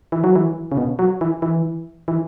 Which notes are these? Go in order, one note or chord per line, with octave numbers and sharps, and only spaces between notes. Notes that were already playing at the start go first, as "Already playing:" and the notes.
E3
F#3
E3
C#3
B2
F#3
E3
E3
E3